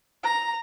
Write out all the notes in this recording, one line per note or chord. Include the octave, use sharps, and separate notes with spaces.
A#5